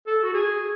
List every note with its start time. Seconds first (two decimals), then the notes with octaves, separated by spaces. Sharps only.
0.07 A4
0.23 F#4
0.34 G#4